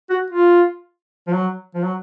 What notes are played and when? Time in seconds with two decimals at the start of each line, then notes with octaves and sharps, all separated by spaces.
0.10 F#4
0.30 F4
1.27 F3
1.33 F#3
1.74 F3
1.84 F#3